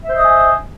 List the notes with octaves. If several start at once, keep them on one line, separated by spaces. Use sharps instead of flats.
C5 D#5 E5 G#5 D#6